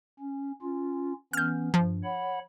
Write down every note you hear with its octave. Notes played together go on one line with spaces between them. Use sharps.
C#4
C#4 F4
E3 B3 C#4 F6 G6
G2 F3
C#5 F#5 B5